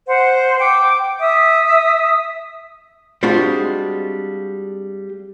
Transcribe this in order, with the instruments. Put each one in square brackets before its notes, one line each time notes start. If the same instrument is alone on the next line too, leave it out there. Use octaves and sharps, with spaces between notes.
[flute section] C5 F#5
G5 D6
E5 D#6
[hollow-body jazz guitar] G3 G#3 C4 D4 F4 F#4